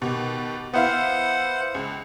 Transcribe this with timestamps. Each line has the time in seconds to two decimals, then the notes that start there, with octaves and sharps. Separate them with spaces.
0.02 B2 D#3 G4
0.74 B3 E4 C5 F5 F#5
1.74 C#2